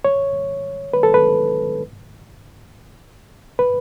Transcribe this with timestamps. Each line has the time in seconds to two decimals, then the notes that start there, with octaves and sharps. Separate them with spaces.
0.05 C#5
0.93 B4
1.03 A4
1.14 B4
3.59 B4